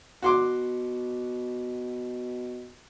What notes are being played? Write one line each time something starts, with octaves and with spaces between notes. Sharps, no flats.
B2 F#4 C6 D6